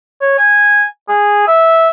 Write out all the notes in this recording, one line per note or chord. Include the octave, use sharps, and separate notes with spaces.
C#5
G#5
G#4
E5